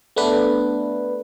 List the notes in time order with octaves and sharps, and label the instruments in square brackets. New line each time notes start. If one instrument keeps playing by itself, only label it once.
[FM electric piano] A3 B3 D4 B4